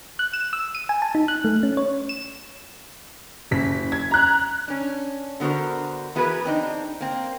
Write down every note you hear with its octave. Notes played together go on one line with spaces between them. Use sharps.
F#6
E7
E6
D#7
G#5
A5
D#4
F#6
A3
C#4
C#5
E7
F#1 B6
G#6
A#5 F#6
C#4 D4
D3 B3 F#4 A#4 C5
E3 B3 F#4 G#4 A#4 B4
C4 D4 D#4
A#3 C4